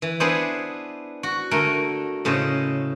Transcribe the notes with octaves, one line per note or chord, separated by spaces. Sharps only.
E3
B3 D4 E4 G#4 C5 D5
F#4
D3 A3 A#4 G#5
A2 C#3 C5 D#5